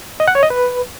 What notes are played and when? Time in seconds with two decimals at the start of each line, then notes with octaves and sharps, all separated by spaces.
0.20 D#5
0.28 F#5
0.35 C#5
0.43 D#5
0.50 B4